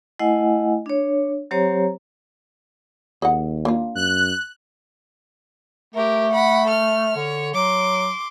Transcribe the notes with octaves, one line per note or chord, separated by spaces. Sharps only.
A3 E4 D#5 F#5 G#5
D4 C#5
F#3 C4 G4 C5 C#5 A#5
D#2 G#4 D#5 F#5
A#3 D4 F4
F#2 F#6
A3 G4 A#4
F#5 B5
A4 F6
D3 C#5
F#3 C6 D6